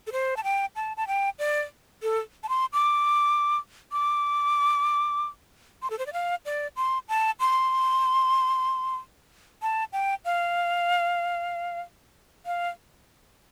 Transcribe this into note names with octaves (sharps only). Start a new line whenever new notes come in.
A4
C5
A5
G5
A5
A5
G5
D5
A4
A5
C6
D6
D6
C6
A4
C5
D5
F5
D5
C6
A5
C6
A5
G5
F5
F5